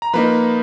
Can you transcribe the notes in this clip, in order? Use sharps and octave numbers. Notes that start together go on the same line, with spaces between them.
A#5
F3 A#3 D#4 B4 B5